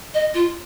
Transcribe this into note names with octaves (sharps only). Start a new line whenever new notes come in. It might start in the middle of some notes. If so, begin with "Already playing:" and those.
D#5
F4